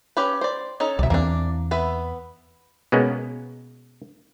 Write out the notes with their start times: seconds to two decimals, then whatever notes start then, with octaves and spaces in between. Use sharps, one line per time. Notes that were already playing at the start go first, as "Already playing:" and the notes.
0.17 C#4 G4 B4
0.41 C5 D5
0.80 C#4 D#4 A4
0.99 C2 B2 D5 E5
1.10 E2 E3 A#3 C4 D4
1.71 B3 B4 E5
2.92 B2 G#3 A#3 B3 C#4